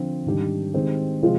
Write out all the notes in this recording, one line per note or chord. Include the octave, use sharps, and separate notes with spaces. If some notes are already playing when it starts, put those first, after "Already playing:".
Already playing: D3 F3 C4 F4
G#2 D#3 G3 D4 G4
D#3 G#3 C4 G4
C3 F3 G#3 C4 F4